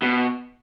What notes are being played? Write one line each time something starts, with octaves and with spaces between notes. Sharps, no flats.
B2